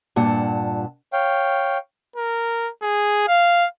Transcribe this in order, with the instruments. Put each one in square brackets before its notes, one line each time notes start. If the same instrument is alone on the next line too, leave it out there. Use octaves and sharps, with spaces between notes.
[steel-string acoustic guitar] G2 A#2 F#5 A5
[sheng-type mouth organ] C#5 F5 G5
[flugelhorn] A#4
G#4
F5